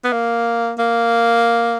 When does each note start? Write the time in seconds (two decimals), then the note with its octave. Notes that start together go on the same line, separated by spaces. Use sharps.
0.05 B3
0.13 A#3
0.79 A#3